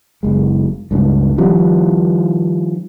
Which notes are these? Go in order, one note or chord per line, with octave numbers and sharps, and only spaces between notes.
F#1 G#3
C#2 G2
D#3 F3 G3 C#4